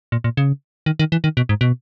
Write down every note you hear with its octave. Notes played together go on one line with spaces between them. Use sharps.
A#2
A#2
C#3
D#3
D#3
E3
D#3
B2
G#2
B2